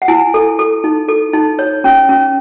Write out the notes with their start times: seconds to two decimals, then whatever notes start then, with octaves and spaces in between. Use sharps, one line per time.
0.02 F#5
0.08 E4 G#5
0.34 A4
0.59 A4
0.84 D#4
1.08 A4
1.33 D#4
1.59 C#5
1.84 C#4
2.09 C#4